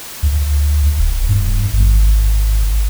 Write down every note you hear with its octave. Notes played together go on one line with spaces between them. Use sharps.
D2
D#1
G2
G#1